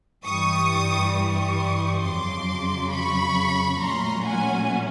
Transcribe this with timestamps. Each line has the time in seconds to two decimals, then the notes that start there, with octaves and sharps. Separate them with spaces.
0.25 G2 E3 G3 C#6 D#6
1.14 C#6 D#6
2.02 F2 C#3 F#3 C6 D6
2.91 B5 C#6
3.79 A#2 F#3 A3 C#4 A#5 C6
4.24 F#5 G#5